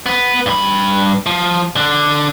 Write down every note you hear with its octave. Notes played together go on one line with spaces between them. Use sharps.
B3 B4
G2 B5
F3
D3 D4